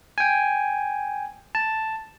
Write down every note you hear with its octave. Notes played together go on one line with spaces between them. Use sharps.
G5 G#5
A5